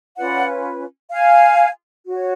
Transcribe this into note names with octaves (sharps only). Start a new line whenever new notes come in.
C#4 F4 B4 D5 F#5
F5 G#5
F#4 C#5